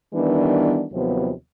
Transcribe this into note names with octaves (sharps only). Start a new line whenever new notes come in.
D#3 E3 G3 B3 D4
D#2 C3 F3 F#3 B3